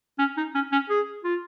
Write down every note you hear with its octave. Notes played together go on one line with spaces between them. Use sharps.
C#4
D#4
C#4
C#4
G#4
F4